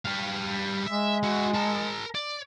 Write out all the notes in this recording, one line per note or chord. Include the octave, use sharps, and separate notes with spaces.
G3 F5
G#3 E5
E4 F#4
A#4 A5
D5